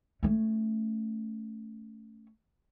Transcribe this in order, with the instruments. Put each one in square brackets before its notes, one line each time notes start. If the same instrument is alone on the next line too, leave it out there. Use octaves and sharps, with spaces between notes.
[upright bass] A3 C#4